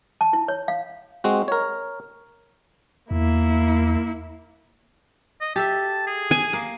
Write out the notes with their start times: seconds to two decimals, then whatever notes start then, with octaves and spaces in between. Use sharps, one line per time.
0.21 A5
0.33 E4
0.48 C#5
0.68 F5
1.24 G#3 C4 F#4
1.48 A#4 C#5
3.11 E2 A#3 E4
5.41 D#5
5.56 G4 A4 E5 A5
6.07 G#4
6.31 G#5
6.53 A#3